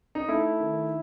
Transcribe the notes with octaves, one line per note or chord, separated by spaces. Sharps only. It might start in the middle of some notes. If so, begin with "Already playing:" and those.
D#4
A3 E4
D#3